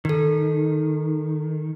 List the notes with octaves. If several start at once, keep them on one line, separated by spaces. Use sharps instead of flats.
D#3 D#4 A4